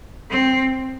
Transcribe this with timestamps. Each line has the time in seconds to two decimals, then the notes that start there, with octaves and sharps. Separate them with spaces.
0.30 C4